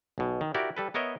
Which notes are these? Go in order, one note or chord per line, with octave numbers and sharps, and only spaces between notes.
B1 B2
D#3
E4 F#4 G4 A#4 D5
G3 A4 B4
B3 A#4 C#5 D#5 E5